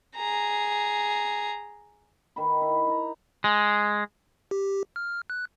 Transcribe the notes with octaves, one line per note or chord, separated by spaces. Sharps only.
G#4 A#5
D#3 B5
E4
D#4 A#5
G#3
G4
F6
F#6